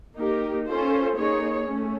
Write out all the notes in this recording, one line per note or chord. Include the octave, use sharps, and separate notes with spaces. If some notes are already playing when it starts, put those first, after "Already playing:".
A#3 D#4 G4 A#4
C#4 F4 A4 C5
A#3 D#4 G#4 C#5
A3 C#4